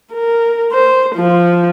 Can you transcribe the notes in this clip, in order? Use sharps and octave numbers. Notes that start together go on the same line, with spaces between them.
A#4
C5
F3